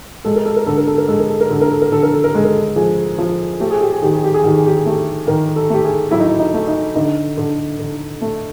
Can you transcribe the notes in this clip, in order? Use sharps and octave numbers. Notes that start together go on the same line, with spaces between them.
G#3 A4
A#4
A4
A#4
D3 A4
A#4
A4
A#4
G#3 A4
A#4
A4
A#4
D3 A4
A#4
A4
A#4
D3 A4
A#4
A4
A#4
G#3 A4
A#4
A4
F3 G#4
F3
A3 G4
G#4
G4
G#4
D#3 G4
G#4
G4
G#4
D#3 G4
G#4
G4
G#4
A3 G4
D#3 A#4
A4
A3 G4
G#4
F#3 E4
D#4
E4
D#4
A3
D#4
D3 D#4
D3
D3
A3